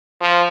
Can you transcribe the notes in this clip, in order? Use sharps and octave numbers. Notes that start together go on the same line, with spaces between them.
F3